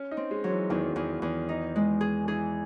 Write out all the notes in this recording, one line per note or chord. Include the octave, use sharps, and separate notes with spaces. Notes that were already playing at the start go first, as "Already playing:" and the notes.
Already playing: C#4
D#4
C4
G#3
F#3
E3
E2 D#3
E2
E2
D#4
G#3
G#4
E3 G#4